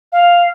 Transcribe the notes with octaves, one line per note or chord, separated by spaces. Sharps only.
F5